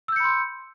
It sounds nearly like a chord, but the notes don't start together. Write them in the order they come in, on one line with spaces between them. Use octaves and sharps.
E6 G6 C#7 B5 C6